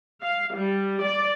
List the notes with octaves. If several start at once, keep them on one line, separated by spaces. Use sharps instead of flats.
F5
G3
D5